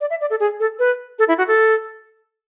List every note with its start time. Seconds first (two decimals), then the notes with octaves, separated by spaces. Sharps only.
0.01 D5
0.10 E5
0.21 D5
0.30 A4
0.40 G#4
0.60 A4
0.79 B4
1.19 A4
1.28 E4
1.38 F#4
1.48 A4